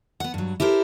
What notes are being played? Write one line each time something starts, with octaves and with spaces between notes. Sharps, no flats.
B3 F#5
G2 F#3
E4 G4 A4 A#4 C5